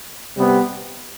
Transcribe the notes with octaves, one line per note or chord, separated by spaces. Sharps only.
C3 G3 B3